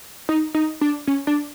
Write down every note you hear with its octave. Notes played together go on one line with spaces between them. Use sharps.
D#4
D#4
D4
C#4
D4